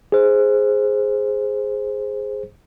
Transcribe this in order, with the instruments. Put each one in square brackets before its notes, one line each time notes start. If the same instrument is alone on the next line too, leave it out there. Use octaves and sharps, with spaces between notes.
[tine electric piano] G#4 C5